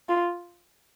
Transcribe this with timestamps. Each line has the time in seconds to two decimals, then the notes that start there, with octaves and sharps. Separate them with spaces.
0.09 F4